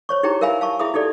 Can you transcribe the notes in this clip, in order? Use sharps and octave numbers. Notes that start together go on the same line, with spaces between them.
C5 C#5 C#6
D#4 E4 G4 G#4 G5 A#5
A#4 E5 F5 G#5 B5
F5 A5 C#6
E4 G#4 E5 B5 D#6
D#4 G4 A4 D5